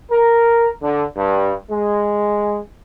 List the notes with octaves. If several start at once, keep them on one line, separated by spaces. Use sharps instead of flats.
A#4
D3
G2
G#3